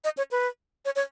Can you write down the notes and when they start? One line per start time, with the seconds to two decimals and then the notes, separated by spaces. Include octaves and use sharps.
0.04 D#5
0.18 C#5
0.31 B4
0.85 C#5
0.96 C#5